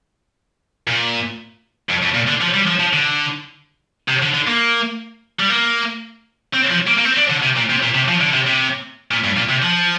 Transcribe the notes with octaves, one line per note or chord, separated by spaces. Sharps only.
A#2
F2
F2
A#2
D3
F3
G3
F3
F3
D3
C3
D3
D3
A#3
G3
A#3
C4
F3
A#3
A#3
C4
D4
D3
C3
A#2
C3
A#2
C3
F3
D3
C3
C3
A#2
G2
A#2
C3
F3